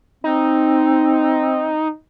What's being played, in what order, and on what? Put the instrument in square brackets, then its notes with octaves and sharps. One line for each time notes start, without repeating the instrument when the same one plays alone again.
[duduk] C4 [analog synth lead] D#4